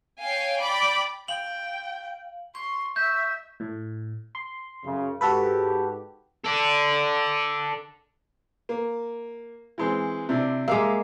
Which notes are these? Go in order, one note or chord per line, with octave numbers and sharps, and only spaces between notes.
C#5 F5 G5 G#5
D5 G5 B5 D6
F5 G5 F#7
C6 C#6
E5 G6
A2
C6
F#2 C#3
G#2 F#4 G4 A4 B4
A4 D5
A#3
E3 G#3 C4
C3 D4 E4
G#3 A#3 E5 F5 D6